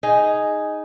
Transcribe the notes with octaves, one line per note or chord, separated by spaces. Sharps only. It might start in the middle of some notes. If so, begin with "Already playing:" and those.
D#4 G#4